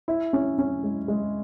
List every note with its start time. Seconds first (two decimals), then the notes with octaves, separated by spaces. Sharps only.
0.08 E4
0.33 C#4
0.59 C#4
0.84 G#3
1.08 G#3